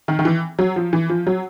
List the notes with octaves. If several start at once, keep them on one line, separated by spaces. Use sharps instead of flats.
D#3
D#3
E3
F#3
F3
E3
F3
F#3